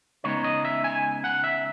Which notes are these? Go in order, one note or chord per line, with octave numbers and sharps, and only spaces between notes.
C#3 G#3 B3 D#4 C#5
D#5
E5
G#5
F#5
E5